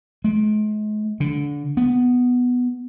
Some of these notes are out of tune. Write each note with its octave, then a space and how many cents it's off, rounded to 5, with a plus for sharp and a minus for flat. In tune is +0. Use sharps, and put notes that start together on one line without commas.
G#3 +40
D3 -20
B3 +0